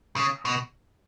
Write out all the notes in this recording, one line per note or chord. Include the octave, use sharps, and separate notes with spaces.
C#3
B2